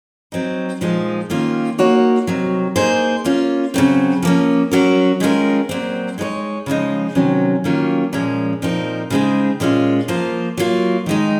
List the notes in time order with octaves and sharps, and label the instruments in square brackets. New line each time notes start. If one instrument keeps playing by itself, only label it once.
[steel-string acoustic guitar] F#3 C4 D#4
A#2 F3 G#3 D#4
D#3 A#3 C#4 F4
A#3 D#4 F#4 C#5
C3 D#3 F#3
A#3 D#4 G#4 C5
A#3 C#4 F4
C#3 F#3 C4
F3 A#3 C#4
F#3 C#4 F#4 A#4
D#3 G#3 C#4 F4 A#4
A#2 F#3 C4
G#3 D#4 A#4 C#5
C#3 F3 G#3 D#4
C3 D#3 F#3 C#4
D#3 F#3 A#3 C#4 F4
A#2 F3 G#3 C#4
A#2 F3 C4 D#4 A#4
C#3 G#3 C4 D#4 G#4
A#2 G#3 C#4 F4
F3 A#3 F4 C5
F#3 A#3 F4
D#3 G#3 D#4